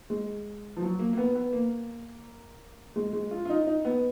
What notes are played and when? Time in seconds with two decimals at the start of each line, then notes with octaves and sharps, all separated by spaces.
0.10 G#3
0.76 F3
0.82 F#3
0.99 A#3
1.13 A#3
1.17 B3
1.35 B3
1.53 A#3
2.96 G#3
3.13 G#3
3.31 F4
3.45 F4
3.50 D#4
3.67 D#4
3.85 B3